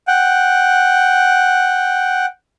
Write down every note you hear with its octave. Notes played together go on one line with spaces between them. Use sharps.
F#5 G5